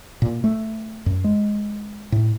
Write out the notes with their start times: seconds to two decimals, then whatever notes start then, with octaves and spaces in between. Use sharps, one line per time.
0.22 A#2
0.44 A3
1.06 F#2
1.24 G#3
2.12 A2